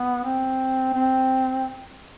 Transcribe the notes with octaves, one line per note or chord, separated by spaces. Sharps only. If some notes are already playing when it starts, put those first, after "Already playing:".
Already playing: B3
C4
C4